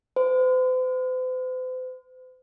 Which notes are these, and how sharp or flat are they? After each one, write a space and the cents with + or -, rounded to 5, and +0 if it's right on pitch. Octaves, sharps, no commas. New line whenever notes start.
C5 -45